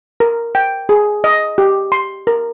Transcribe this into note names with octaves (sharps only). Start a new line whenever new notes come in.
A#4
G5
G#4
D#5
G4
C6
A#4